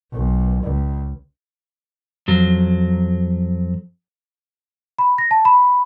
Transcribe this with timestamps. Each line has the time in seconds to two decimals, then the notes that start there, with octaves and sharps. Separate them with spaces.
0.13 B1
0.63 C#2
2.28 F2 F#3
4.99 B5
5.18 A#6
5.31 A5
5.45 B5